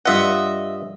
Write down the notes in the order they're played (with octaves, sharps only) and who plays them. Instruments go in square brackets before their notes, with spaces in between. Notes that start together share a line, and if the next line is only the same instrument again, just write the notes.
[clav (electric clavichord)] G2 F4 F#5 [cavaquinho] D#5 E5